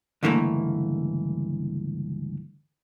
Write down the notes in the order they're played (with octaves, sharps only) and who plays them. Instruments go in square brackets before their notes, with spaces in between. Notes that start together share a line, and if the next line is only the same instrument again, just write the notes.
[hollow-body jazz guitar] C#2 G2 D3 E3 A3 A#3